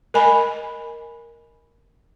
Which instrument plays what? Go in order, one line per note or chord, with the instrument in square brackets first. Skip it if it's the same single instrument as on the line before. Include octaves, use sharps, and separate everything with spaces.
[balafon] A#4 D#5 G#5 B5